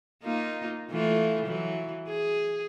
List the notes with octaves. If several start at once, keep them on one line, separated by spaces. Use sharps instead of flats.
A#3 D#4 F4
E3 A3 F4
E3 F#3
G#4